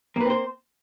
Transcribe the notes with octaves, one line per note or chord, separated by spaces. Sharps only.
A#3 C4 B4 C5